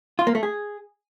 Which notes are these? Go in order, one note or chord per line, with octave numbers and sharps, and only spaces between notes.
F4
A#3
A3
G#4